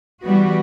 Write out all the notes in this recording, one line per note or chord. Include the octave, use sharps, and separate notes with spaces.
E3 G3 B3 F#4